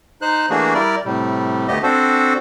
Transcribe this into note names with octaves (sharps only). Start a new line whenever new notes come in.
D#4 C5 F#6
E3 A3 A#3 D4 F#4 G#4
G3 E4 A#4 D5
A2 C3 G3
D2 A3 B3 G4 D#5
C4 D4 F#4 A4 C5